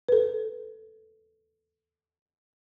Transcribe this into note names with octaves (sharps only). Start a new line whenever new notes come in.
A4 B4